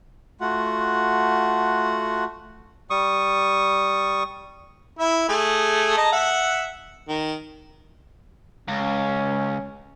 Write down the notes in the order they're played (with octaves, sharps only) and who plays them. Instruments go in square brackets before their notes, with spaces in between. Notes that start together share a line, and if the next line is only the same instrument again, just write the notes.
[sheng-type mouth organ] A3 F4 F#4 F#5
[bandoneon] G3 C#6 D#6
[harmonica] E4 E5
A3 G#4
D#5 A5 A#5
E5 F#5
D#3
[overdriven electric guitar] C#2 [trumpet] C#4